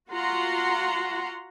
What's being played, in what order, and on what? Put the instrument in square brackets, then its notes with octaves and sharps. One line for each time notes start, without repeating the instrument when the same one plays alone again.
[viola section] F4 F#4 F#5 A#5 C6